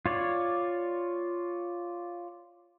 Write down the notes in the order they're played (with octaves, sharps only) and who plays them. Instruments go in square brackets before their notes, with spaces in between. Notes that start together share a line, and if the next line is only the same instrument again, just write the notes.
[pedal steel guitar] F4 C#5 D5